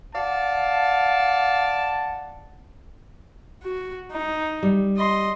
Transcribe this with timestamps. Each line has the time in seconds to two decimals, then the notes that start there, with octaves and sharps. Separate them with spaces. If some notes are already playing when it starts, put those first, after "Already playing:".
0.15 D5 F5 F#5 A5
3.63 F#4
4.12 D#4
4.63 G3
4.97 D#5 C6